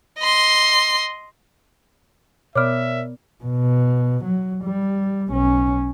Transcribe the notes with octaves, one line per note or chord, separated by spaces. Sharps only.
D#5 C6
B2 B3 A#4 C#5 D5 E5 D6 F6
B2
F#3
G3
B1 C#4